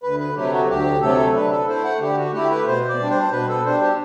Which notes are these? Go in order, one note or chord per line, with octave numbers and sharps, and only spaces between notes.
D2 B4
B4
C3 F#3 A3 G4
F#4
D2 G4
C3 F#3 A3 A4
D3 B4
A4
A3 E4 C5
F#5
D3 G4
F#4
A3 E4 G4
B4
B2 C5
D5
G3 D4
C5
B2 B4
A4
G3 D4 C5
G4